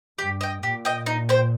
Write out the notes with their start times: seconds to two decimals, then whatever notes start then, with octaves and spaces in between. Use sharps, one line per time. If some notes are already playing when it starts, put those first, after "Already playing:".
0.18 G2 G4
0.41 D#5 G5
0.63 A#2 G4
0.85 D#5 G5
1.06 D#4
1.29 C5 G5